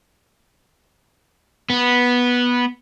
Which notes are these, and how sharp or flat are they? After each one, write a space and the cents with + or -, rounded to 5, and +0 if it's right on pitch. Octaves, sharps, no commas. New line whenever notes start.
B3 -10